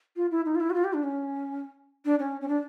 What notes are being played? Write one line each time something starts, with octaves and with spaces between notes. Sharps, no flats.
F4
E4
D#4
F4
E4
F#4
F4
G4
D4
C#4
D4
C#4
C#4
D4